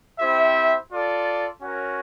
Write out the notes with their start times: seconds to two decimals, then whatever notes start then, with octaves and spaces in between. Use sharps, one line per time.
0.19 C4 E4 G4 C5 E5
0.90 F4 A4 D5
1.61 C#4 F#4 A#4 C#5 F#5